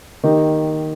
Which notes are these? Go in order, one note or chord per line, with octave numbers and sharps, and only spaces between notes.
D#3 A#3 D#4 G4